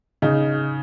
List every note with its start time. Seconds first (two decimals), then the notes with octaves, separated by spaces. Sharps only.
0.22 C#3 D#4